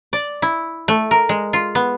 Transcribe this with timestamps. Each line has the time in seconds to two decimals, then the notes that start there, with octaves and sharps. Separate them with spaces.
0.13 D5
0.42 E4
0.88 A3
1.11 A#4
1.29 G#3
1.53 F4
1.75 B3